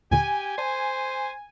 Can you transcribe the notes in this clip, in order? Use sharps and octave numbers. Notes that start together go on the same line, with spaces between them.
D#2 A#2 D3 G4 G#5
C5 D5 A5